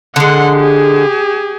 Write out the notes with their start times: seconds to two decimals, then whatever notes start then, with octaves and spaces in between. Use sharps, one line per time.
0.16 D3 G#3 F#5 C6
0.56 G4 G#4